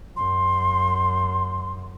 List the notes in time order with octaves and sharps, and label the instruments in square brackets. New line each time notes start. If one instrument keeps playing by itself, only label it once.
[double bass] F#2 [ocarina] C6